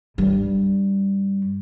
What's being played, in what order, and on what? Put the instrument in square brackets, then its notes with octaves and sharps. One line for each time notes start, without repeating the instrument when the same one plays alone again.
[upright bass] G2 G3